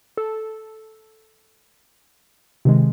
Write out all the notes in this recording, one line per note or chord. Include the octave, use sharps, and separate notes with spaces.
A4
C3 D#3 G#3